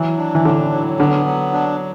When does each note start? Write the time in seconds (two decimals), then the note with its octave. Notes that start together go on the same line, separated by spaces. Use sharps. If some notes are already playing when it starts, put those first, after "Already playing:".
Already playing: E3 F#3
0.18 D4
0.35 E3
0.44 A2 D3
0.72 F#3
0.99 D3 B3
1.26 F#3
1.53 D4